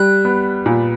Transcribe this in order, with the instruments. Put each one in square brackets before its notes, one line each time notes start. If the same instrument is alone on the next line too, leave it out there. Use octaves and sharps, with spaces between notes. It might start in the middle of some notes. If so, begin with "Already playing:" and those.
Already playing: [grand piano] G3 [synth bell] F#6
[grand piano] B3
A#2